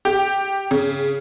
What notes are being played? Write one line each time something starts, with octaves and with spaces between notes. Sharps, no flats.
G4
C#3